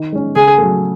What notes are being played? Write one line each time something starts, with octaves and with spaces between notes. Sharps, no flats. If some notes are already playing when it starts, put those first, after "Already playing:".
Already playing: D#3
G#3 C#4
C#3 G#4
F#3 A3